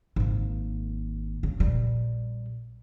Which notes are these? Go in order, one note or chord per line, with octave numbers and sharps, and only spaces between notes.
G#1 A#3
C#3
A#1 G3